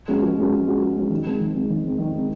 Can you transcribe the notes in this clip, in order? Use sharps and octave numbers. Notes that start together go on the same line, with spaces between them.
G#3 C#4 F#4
F3
G#3 C#4 F#4
F3
G#3 C#4 F#4
F3
G#3 C#4 F#4
D#3
G#3 C4
D#3
G#3 C4
D#3
G#3 C4
D#3
G#3 C4